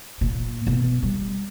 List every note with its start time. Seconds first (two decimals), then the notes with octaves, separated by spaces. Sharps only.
0.21 A#2
0.67 B2
1.03 G3